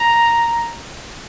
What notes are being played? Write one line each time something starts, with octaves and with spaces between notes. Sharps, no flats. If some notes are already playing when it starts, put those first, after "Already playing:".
Already playing: A#5